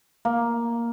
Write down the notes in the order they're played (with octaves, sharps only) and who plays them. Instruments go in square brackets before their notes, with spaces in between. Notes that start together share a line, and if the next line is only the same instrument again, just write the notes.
[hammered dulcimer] A#3